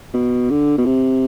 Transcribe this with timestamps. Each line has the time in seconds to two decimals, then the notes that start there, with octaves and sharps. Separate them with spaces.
0.14 B2
0.50 D3
0.78 B2
0.86 C3